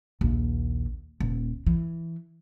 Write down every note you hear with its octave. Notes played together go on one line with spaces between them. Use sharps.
A#1 D#2
D#1
E3